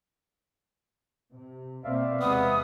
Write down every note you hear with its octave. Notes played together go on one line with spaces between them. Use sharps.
C3
B2 A#3 C4 D5 E5 F5
E2 C3 G#3 B3 D#6